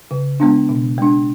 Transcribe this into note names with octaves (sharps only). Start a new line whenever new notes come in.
C#3
G#3 B3 D4
B2
G#3 D4